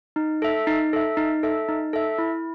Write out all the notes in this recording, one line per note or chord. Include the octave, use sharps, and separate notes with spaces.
D#4
A4 E5
D#4
A4 E5
D#4
A4 E5
D#4
A4 E5
E4